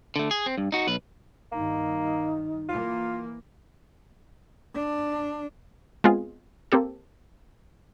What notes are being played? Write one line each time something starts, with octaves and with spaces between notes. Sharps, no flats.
D3 A3
G#4
C4
G2
D#4 F#4
B1 B4
G2 D#3 A#3 D#4
E3 A#3 F4
D4
G#3 B3 C4 F4 G#4
A#3 C4 G4 A4